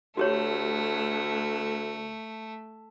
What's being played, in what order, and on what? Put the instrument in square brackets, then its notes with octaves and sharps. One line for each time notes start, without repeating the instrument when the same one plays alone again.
[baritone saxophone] D2 [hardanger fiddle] A3 [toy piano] F#4 G4 C#5